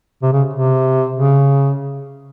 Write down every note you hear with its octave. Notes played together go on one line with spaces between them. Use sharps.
C3
C#3
C3
C#3